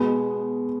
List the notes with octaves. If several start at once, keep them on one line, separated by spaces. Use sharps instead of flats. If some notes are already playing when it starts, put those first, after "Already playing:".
Already playing: B2 G#3 B3